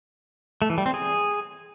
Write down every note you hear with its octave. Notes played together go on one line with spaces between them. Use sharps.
A3
E3
G3
C4
G#4